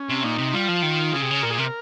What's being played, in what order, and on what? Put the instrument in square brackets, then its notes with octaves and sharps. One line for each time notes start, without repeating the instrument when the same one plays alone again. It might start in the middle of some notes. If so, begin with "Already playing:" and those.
Already playing: [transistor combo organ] C#4
[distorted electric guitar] C3
[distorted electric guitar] A#2 [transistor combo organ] D#4
[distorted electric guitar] C3
[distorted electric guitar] G3 [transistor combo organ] F4
[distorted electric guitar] F3
D#3
[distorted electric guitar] C#3 [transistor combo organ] G#4
[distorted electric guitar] C3
C#3
[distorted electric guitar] A#2 [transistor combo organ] A#4
[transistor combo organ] G#4
[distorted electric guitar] C3 [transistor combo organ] A#4